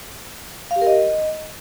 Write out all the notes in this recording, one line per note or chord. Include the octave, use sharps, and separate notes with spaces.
F5
G4
A#4
D#5